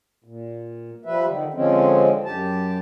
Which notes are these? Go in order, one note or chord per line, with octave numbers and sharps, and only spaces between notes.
A#2
F3 G3 B4 E5
D3 D#3
D3 F3 G#3 C4 C#4
F#2 G4 A5